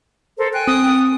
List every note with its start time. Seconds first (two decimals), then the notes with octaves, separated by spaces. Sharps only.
0.38 A4 A#4 C5
0.53 G5 G#5 F#6
0.67 C4 D#6